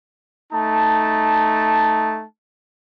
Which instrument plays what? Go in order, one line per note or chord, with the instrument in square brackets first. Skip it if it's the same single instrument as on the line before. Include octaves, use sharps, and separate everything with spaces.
[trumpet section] A3 D#4 A5